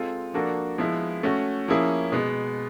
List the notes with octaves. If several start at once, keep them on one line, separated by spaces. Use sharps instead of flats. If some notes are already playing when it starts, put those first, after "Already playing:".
Already playing: G#3 C4 F4 A4
F3 A#3 D4 F#4 A4
F3 G#3 B3 E4
A3 C#4 F#4
F3 A#3 C#4 E4 G#4
B2 G#3 B3